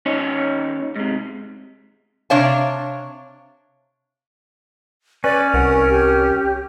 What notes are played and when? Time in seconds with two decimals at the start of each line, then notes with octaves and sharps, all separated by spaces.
0.06 D#2 C#4 D#4 C#5
0.96 G#2 C3
2.30 C3 D4 C#5 F5 A5
5.24 C#4 B4 D5
5.54 C2 A#4 F#5
5.89 G4